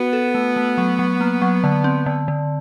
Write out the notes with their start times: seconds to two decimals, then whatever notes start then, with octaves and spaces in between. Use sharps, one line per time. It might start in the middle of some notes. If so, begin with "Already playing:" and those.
Already playing: B3 F#4
0.13 A4
0.35 A3
0.56 A3
0.78 F#3
0.99 F#3
1.21 A#3
1.42 F#3
1.64 D3
1.84 C4
2.06 D3
2.28 D3